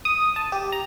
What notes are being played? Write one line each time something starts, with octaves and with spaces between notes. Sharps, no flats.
D#6
A5
G4
A#5